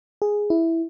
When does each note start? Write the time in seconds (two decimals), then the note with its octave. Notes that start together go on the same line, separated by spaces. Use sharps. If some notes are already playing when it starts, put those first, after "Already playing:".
0.22 G#4
0.50 E4